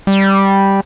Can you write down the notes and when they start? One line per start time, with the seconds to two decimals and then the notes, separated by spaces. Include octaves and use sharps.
0.07 G3